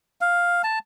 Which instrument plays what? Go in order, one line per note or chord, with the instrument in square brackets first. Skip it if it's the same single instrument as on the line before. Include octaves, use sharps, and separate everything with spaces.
[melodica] F5
A5